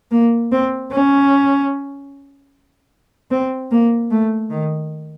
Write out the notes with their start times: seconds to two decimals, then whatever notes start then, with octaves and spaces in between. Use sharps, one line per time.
0.11 A#3
0.52 C4
0.92 C#4
3.31 C4
3.71 A#3
4.11 A3
4.50 D#3